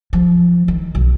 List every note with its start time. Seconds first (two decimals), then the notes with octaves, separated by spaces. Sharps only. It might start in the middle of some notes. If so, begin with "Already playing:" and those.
0.13 F3
0.68 D#3
0.95 B1